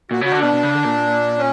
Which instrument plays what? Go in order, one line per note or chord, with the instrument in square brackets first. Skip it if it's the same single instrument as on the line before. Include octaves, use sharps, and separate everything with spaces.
[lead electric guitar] A#2 [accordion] F#4
[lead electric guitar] C#3 [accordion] F#4
[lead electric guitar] D3
[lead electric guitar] B2 [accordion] D4
[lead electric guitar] B2
C#3
D3
A#2
[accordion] C#4